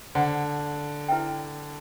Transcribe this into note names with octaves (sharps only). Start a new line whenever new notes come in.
D3 C5 F#5 A5
E4 B4 E5 G5